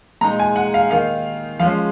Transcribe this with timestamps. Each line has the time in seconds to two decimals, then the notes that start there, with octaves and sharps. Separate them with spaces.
0.21 A#2 G#3 D#4 A#5
0.40 G#5
0.56 F#5
0.74 F5
0.90 D#3 A#3 D#4 F5
1.59 F3 F5
1.62 G#3 C#4